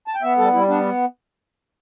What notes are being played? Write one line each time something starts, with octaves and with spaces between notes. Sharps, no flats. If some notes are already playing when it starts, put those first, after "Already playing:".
A5
G5
B3 E5
G3 A4
G3 E4
B3 D4